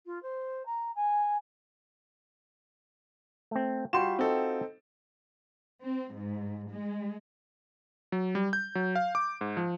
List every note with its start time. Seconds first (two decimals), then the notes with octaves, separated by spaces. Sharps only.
0.06 F4
0.22 C5
0.65 A#5
0.95 G#5
3.51 A3 C4
3.93 G3 F4 F#4 G5 C6 E7
4.19 C4 D#4 A4
5.81 C4
6.13 G#2
6.71 G#3
8.12 F#3
8.35 G3
8.53 G6
8.75 F#3
8.96 F5
9.15 D6
9.41 G#2
9.57 F3